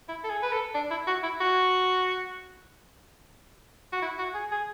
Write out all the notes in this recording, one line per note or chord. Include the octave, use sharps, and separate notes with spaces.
E4
A4
G#4
B4
A4
D4
E4
F#4
E4
F#4
F#4
E4
F#4
G#4
G#4